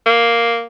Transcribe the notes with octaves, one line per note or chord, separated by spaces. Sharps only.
A#3